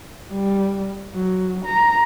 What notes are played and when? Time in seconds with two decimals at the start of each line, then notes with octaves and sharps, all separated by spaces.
0.32 G3
1.14 F#3
1.65 A#5